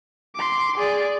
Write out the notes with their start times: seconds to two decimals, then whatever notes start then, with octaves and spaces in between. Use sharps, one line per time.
0.35 C6 D6
0.77 G#4 D5